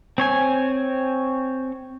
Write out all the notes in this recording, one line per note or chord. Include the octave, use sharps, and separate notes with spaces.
C4 C#5 G#5